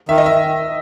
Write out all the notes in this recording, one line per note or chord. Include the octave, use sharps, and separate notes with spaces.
D#3 E5
D#5
E5